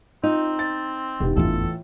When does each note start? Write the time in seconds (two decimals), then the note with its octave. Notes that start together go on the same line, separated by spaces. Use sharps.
0.24 C4 D#4 F4
0.59 A6
1.20 E1 D#3 B3 G4
1.37 G1 E2 A2 E3 F4 A4